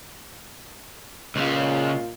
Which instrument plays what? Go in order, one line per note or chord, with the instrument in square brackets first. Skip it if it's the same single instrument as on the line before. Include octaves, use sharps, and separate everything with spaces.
[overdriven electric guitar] C#2 C#3 [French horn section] A#2 F4 D#5